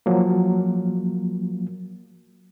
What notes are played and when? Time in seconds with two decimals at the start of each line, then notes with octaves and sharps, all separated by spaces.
0.06 F3 F#3 A#3